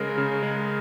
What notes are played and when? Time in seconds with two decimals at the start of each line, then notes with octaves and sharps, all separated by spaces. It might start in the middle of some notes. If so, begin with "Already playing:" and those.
Already playing: C#3 G#3 A#4
0.18 C#3
0.43 G#3